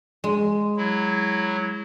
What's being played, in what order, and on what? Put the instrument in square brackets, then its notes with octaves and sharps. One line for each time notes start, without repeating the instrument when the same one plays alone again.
[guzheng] G#3
[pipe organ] F#3 E4